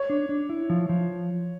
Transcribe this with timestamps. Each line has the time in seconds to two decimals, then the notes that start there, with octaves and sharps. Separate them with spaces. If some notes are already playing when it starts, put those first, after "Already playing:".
Already playing: C#5
0.10 D4
0.29 D4
0.49 E4
0.70 F3
0.89 F3